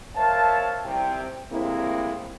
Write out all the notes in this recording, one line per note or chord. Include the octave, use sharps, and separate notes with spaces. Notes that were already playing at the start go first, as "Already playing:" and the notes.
A#4 C5 C#5 E5 F5 A5
C2 C3 G5
A2 C3 G#3 A#3 C4 E4